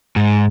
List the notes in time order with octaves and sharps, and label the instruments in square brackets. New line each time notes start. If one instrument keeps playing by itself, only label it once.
[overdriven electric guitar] G#2